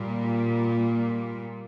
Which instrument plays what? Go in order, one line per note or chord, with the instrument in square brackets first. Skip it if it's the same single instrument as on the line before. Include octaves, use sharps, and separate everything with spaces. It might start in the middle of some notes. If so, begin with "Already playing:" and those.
Already playing: [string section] A#2 G3